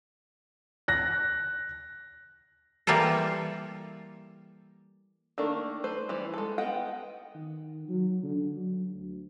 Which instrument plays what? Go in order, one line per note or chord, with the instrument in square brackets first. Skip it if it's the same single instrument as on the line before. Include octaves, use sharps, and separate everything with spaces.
[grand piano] F#6 A#6
[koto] E3 G3 A#3 F4 A4
[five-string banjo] D#3 A3 A#3 D4
A3 B4 C5
E3 G3
G#3 A4
B3 D#5 F#5 G5
[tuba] D#3
F#3
D3
F#3
D2